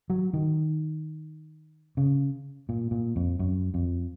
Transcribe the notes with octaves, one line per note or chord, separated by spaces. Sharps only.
F#3
D#3
C#3
A#2
A#2
F2
F#2
F2